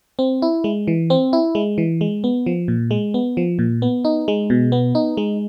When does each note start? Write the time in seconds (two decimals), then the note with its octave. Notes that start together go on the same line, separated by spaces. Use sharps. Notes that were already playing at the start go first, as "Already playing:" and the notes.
0.19 C4
0.42 E4
0.64 G#3
0.88 E3
1.10 C4
1.33 E4
1.55 G#3
1.78 E3
2.01 G#3
2.24 B3
2.46 F3
2.68 A#2
2.91 G#3
3.14 B3
3.37 F3
3.59 A#2
3.82 B3
4.05 D#4
4.28 G#3
4.50 B2
4.72 B3
4.95 D#4
5.17 G#3